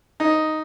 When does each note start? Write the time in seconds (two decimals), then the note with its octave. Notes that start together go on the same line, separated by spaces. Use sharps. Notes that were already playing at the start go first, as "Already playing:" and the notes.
0.20 D#4